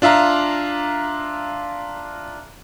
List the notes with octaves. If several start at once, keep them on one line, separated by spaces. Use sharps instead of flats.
D4 F4 E5 F5 A#5